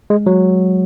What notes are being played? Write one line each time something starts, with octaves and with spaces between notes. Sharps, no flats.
G#3
F#3